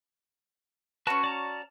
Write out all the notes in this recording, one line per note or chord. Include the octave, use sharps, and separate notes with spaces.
C#4 F#4 B4 A5
D5 A5 A#5